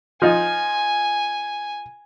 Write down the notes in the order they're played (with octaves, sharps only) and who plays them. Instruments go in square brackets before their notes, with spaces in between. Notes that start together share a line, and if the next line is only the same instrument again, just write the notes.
[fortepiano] F3 D#4 F4 [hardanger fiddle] G#5